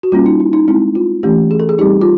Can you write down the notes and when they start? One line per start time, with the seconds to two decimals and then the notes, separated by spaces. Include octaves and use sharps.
0.03 F#4
0.12 G3 A#3 C#4 F4
0.26 D#4
0.40 E4
0.53 D#4
0.68 G#3 C4 D#4 E4
0.95 F4
1.23 E3 A3 C#4 G4
1.51 G#4
1.60 A4
1.69 G#4
1.78 G3 C4 D#4 G4
2.01 F4